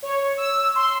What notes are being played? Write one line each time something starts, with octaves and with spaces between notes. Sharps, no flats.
C#5
E6
C6